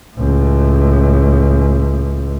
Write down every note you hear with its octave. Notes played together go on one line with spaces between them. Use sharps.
C#2 A2